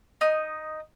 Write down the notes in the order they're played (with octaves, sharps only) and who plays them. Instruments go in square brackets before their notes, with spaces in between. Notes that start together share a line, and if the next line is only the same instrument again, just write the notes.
[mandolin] D#4 D#6